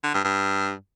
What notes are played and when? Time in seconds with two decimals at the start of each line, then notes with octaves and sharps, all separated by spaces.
0.03 D3
0.14 G2
0.24 G2